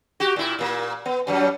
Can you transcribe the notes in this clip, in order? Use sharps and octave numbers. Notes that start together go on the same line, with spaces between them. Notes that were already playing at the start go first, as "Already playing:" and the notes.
F#4 G4
A#2 E4
A#2 A#3
B3
F#2 F#3 G3